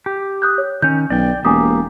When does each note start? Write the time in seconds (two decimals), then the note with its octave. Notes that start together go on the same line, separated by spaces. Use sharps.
0.06 G4
0.42 D#6 F#6 G6
0.58 C#5
0.82 D#3 C#4 G6
1.10 B1 D5 G5
1.45 E1 A#3 G4 G#5 D6 D#6